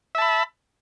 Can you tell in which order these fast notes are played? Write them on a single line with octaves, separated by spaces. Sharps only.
E5 A5 B5